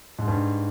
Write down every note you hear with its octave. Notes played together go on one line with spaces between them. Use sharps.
G#2
G2